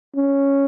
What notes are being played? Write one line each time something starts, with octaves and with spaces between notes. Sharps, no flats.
C#4